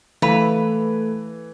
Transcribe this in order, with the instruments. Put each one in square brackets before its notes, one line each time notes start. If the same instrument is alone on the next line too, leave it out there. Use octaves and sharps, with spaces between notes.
[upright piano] E3 [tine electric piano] A3 A4 [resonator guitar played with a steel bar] B4 [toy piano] F5 B5